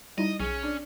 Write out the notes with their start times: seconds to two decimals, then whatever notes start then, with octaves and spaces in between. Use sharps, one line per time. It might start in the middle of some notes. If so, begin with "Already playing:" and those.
0.18 G3 D#4 E4 D#5
0.40 B1 C#4 G#4
0.63 D4